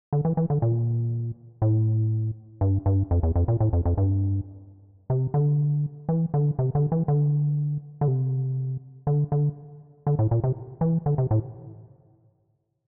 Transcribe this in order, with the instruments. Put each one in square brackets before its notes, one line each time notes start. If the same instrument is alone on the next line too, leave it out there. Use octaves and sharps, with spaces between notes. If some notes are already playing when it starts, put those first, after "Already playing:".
[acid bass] D3
E3
E3
D3
A#2
A2
G2
G2
F2
E2
F2
A#2
A2
F2
F2
G2
C3
D3
E3
D3
C3
D3
E3
D3
D3
C3
D3
D3
D3
A2
A#2
C3
E3
D3
C3
A2